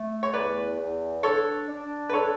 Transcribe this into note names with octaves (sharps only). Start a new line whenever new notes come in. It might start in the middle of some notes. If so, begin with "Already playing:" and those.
Already playing: A3
C#5
E2 B4 D5
E2
D4 A4 C#5
D4
B4
D4 A4 C#5